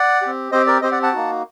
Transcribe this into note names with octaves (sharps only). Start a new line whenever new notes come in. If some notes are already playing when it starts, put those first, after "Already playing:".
Already playing: D5 F#5
C4 G4
C4 G4 C5 D#5
A#4 D5
C4 G4 C5 D#5
D5 F#5
F#5 A5
A#3 D#4 F#4